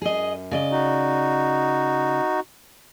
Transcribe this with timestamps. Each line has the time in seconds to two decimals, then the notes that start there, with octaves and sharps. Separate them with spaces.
0.02 F#2 G#4 D#5
0.51 C#3 D5 D#5
0.72 D#4 F#4